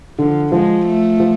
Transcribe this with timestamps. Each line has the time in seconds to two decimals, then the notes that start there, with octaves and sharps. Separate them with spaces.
0.19 D3 F3
0.52 F3 G#3
0.86 A3
1.20 F3